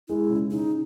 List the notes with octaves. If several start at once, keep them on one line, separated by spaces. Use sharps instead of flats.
G#3 E4
C#3
C#3 D#4